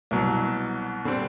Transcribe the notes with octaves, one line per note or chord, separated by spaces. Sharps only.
C2 B2 F#3
D3 G3 C4